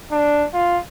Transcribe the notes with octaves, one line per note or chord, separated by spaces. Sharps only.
D4
F4